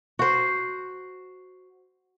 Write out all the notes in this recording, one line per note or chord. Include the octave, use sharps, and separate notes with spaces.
F#4 C5